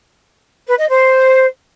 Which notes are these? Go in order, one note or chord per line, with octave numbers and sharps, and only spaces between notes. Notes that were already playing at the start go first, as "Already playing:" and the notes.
B4
D#5
C5